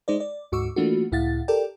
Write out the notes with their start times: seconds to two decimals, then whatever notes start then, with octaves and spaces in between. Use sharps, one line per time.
0.08 G#3 D#4 C5 D5
0.20 D5
0.52 D2 G#2 F#4 C#6 D6 E6
0.76 E3 A3 A#3 D4 F4 F#4
1.12 C#2 A2 E4 F5 F#5 A6
1.48 G4 A4 A#4 D5 G5